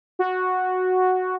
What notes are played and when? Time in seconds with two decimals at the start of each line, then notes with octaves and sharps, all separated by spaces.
0.19 F#4